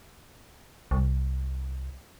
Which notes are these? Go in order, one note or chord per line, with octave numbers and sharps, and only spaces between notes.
C2